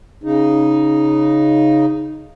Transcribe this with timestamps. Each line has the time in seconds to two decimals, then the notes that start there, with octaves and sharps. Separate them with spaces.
0.24 C#3 D#4